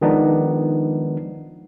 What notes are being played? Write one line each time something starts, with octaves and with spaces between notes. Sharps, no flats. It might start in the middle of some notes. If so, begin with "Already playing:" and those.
D#3 F3 G#3 B3 D4 D#4